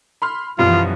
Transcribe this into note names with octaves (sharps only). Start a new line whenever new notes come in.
B5 C6 F6
B1 F#2 E3 F3 G3 B3 F4